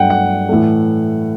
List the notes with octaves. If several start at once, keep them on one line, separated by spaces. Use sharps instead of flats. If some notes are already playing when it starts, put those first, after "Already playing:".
Already playing: G2 F#3 A3 F#5 G5
F#5
A2 E3 A3